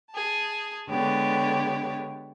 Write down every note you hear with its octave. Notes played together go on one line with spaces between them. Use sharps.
G#4 A5
D3 G#3 B3 G4 C#5